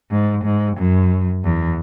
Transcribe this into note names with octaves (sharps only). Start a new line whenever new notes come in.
G#2
G#2
F#2
E2